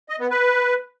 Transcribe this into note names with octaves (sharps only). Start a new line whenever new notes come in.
D#5
B3
B4